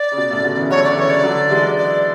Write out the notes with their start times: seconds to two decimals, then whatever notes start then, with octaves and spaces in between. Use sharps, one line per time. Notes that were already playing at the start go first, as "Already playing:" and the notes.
Already playing: D5
0.12 C#3
0.17 B2
0.31 A2 C#3
0.44 B2 D3
0.57 C#3 E3
0.70 D3 F#3 C#5
0.84 D5
0.92 D3
0.97 C#3 E3 C#5
1.10 D5
1.23 D3 F#3
1.50 E3 G#3
1.78 D5